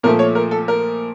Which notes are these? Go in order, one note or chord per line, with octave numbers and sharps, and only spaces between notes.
A#2 F3 A3 A#4
C#5
A#4
A4
A#4